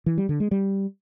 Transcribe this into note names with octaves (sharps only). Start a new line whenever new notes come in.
E3
G3
D3
G#3
G3